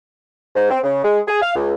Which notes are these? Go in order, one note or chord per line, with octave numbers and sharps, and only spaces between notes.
G#2
C4
C#3
G#3
G#4
F5
C#2